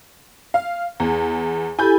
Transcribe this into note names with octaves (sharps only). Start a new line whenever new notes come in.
F5
E2 G#4
E4 G4 A4 G#5 B5 G6